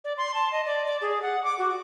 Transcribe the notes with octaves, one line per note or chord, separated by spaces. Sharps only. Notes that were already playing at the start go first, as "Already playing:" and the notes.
D5
C6
A5
D#5
D5
D5
G#4
F#5
D6
F#4